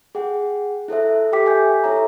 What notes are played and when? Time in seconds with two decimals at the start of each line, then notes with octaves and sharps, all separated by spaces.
0.15 G#4 F#5 G5
0.88 E4 A4 C5 E5
1.32 G4 A4 G5 D6 B6
1.45 E5 G#5 G6
1.84 E4 A4 C#5 E5 A#5